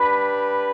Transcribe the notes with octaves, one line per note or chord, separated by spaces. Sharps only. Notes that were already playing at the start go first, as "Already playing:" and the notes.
Already playing: D4 G4 B4 B5